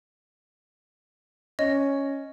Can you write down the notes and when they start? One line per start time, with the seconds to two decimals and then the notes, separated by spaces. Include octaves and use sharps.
1.59 C#4 D#5